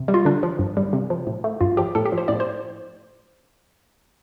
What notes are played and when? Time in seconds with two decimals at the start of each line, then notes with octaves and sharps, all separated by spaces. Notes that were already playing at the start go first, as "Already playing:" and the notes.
Already playing: C3
0.08 G3
0.14 F4
0.25 D3 D4
0.43 F3
0.59 G2
0.77 G3
0.93 C3
1.10 F3
1.27 A2
1.44 A3
1.61 G2 F4
1.77 F3 G4
1.95 A2 A4
2.06 G4
2.12 F3
2.18 C5
2.28 A2 D5
2.40 C5